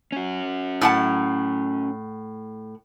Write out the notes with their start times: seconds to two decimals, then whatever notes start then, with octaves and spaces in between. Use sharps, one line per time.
0.12 C#4 F#4
0.81 A2 F#5 A5